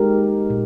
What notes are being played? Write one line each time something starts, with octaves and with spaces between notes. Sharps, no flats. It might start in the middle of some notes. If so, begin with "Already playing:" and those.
Already playing: G#3 D#4 G4 A#4
A#2